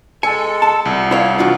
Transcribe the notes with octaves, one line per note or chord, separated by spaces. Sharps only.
G#3 A4 G#5 C#7
A5
C2 A#2
E4 C#5 F5
F2 D#3 E3 D4 F4 F#4